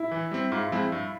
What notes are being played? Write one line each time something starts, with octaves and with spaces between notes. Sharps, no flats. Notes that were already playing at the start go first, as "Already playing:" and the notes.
Already playing: E4
E3
G3 C4
G#2 F4
F3 G#3 C4 E4
G2